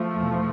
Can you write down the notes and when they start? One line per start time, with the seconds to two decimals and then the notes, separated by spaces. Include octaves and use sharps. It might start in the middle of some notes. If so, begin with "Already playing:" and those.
Already playing: F3 A3
0.13 E2 B2